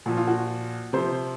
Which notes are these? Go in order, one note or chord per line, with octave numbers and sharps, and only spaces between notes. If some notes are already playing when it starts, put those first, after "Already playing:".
A#2 F3 F#4
F4
F#4
C3 F3 C5